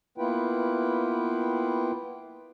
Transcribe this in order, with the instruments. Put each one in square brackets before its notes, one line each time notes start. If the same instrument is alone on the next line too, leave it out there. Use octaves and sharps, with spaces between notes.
[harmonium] A#3 B3 E4 F4 B4 G5